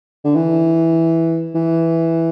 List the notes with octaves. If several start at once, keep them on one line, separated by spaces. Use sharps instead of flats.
D3
E3
E3